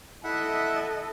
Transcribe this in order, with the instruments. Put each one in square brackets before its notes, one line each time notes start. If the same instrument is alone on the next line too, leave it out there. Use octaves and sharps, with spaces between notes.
[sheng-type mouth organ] E4 E5 F#5 [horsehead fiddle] A4 D#5